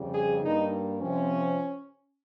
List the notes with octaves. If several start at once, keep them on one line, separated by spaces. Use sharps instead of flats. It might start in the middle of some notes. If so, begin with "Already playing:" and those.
Already playing: F2 C#3 G3
G#4
G2 G3 A#3 D#4
C3 F3 C4 C#4